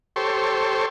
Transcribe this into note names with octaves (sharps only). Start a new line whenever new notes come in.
G4 A4 C5 C#5